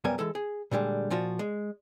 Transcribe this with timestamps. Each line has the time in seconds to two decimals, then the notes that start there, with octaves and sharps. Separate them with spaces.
0.04 C2 F#2 G3 B3 A#4 G#5
0.19 E3 G#3 A4
0.35 G#4
0.71 A#2 D3 G3 G#3
1.10 A#2 F3 F4 F#4
1.39 G#3